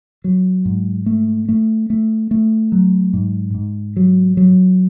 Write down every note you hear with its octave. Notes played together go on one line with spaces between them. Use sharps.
F#3
G#2
A3
A3
A3
A3
F#3
G#2
G#2
F#3
F#3